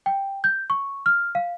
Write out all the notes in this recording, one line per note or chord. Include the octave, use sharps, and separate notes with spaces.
G5
G6
C#6
F6
F5